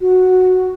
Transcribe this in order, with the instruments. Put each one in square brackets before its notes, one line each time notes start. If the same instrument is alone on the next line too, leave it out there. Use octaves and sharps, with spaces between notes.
[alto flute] F#4